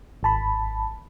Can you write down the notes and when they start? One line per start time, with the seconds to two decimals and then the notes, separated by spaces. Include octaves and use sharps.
0.23 G#1 A5 B5